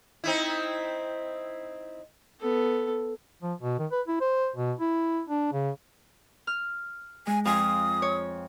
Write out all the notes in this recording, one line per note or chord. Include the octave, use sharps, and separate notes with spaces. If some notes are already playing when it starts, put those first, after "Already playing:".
C4 D#4 E4
B3 A4
F3
B2
D#3
B4
E4
C5
B2
E4
D4
C#3
F6
G#3 G#5
F2 F4 G#5 D#6
C#5